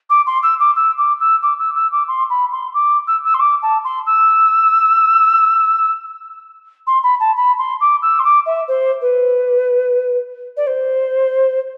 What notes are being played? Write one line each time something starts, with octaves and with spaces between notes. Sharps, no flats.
D6
C6
E6
D6
E6
D6
E6
D6
E6
E6
D6
C6
B5
C6
D6
E6
E6
C6
D6
A5
C6
E6
C6
B5
A5
B5
C6
D6
E6
C6
D6
E5
C5
B4
D5
C5